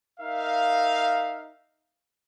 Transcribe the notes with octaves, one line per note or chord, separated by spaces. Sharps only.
D#4 A#4 E5 F5